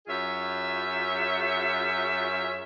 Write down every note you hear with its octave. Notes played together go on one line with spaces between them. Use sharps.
F#2 F4 G#4 C#5 E5